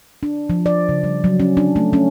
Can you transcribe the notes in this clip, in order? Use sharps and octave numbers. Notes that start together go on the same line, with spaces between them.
D4
F3
D5
C#3
G3
F#3
C#4
D4
A3
C#4